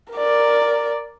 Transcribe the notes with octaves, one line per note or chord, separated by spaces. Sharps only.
A#4 D5